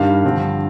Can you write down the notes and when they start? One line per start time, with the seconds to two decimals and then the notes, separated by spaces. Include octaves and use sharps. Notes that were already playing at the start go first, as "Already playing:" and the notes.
Already playing: G2 D#3 G3 F5
0.24 G2 D3 F3 C4